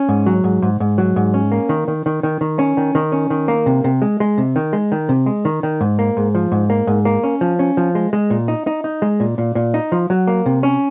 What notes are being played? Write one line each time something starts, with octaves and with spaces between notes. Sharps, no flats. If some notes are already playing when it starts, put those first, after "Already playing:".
Already playing: C#4
G#2
F#3
G#2
G#2
G#2
F#3
G#2
C#4
A#3
D#3
D#3
D#3
D#3
D#3
C#4
D#3
D#3
C#4
D#3
A#3
C3
C3
G#3
G#3
C3
D#3
G#3
D#3
C3
G#3
D#3
D#3
G#2
A#3
G#2
F3
G#2
A#3
G#2
A#3
C#4
F3
C#4
F3
G#3
G#3
A#2
D#4
D#4
D#4
G#3
A#2
A#2
A#2
D#4
F3
F#3
A#3
C3
C#4